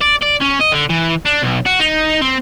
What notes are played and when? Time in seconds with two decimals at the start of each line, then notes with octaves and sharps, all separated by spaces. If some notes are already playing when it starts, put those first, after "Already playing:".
0.01 D5
0.22 D5
0.42 C#4
0.61 D#5
0.73 D3
0.90 E3
1.26 D4
1.43 B1
1.66 F#4
1.80 D#4
2.22 C4